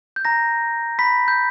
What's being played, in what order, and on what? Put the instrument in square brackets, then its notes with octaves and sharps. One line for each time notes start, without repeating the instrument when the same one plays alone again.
[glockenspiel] G6
A#5 A#6
B5 B6
G6